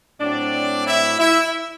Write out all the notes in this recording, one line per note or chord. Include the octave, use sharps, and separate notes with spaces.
A2 F#3 C4 D4 D5
E4 E5
E4 E5